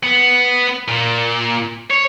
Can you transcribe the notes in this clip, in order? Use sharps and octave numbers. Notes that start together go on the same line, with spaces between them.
B3
A#2
C#5